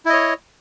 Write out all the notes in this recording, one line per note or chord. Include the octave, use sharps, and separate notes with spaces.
E4 C#5 D#5